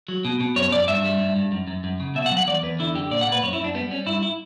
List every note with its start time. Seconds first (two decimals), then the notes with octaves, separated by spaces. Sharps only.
0.08 F#3
0.25 B2
0.41 B2
0.56 F#2 C#5
0.72 F#2 D5
0.88 G2 E5
1.04 G3
1.20 G2
1.36 G2
1.52 F#2
1.67 F#2
1.84 F#2
2.00 C#3
2.15 B2 E5
2.26 F#5
2.31 F#3
2.37 F#5
2.47 E2 D5
2.63 E2 B4
2.79 D3 E4
2.94 F#2 G4
3.11 A#2 D5
3.21 F#5
3.27 A#2
3.32 B4
3.43 F#2 C#5
3.53 E4
3.59 F#2
3.64 D4
3.74 G3 B3
3.90 G3 C#4
4.06 G2 E4
4.23 E4